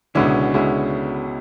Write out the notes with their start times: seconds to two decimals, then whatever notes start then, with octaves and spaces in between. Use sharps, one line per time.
0.15 C#2 B2 D3 G#3 C#4 E4
0.54 C#2 B2 G#3 C#4 E4